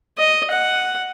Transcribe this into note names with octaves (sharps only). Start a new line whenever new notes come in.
D#5
F#5